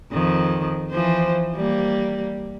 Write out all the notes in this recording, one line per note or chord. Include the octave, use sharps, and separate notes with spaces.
F2 D#3
E3 F3 C5
G3 A#3